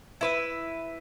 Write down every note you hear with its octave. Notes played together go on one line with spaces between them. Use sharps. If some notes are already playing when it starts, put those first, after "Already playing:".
E4 B4 E5